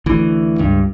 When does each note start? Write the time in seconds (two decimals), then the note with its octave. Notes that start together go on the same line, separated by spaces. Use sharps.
0.06 D2 E3
0.58 C#2 G2